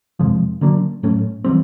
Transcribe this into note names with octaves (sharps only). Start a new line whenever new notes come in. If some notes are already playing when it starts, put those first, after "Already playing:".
F2 C3 F3 G#3
D3 F#3 A#3 D4
A2 F#3 A3 C#4
E3 G3 C4